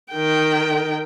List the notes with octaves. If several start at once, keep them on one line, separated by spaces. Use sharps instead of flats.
D#3 G5